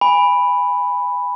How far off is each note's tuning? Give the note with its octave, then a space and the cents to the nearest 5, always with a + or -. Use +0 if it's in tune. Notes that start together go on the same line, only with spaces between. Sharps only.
G#5 -20 B5 +0